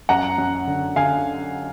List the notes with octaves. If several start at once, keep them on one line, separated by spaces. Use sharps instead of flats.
F#2 F#5 A#5
F#2
D3
D3 F5 G#5